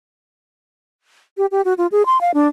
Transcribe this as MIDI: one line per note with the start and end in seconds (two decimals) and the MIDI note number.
1.38 1.46 67
1.52 1.61 67
1.65 1.74 66
1.78 1.87 65
1.92 2.05 68
2.06 2.20 84
2.21 2.31 77
2.34 2.48 62